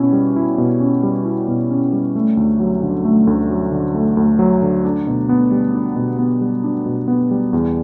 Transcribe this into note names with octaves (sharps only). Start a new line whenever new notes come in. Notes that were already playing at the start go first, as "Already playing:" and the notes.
Already playing: B2 C#4 E4
G3
E4
B2
C#4
G3
E4
B2
C#4
G3
A3
D2
F#3
D3
A3
D2
F#3
D3
A3
D2
F#3
D3
D4
B2
B3
G3
D4
B2
B3
G3
D4
B2
B3
G3
E2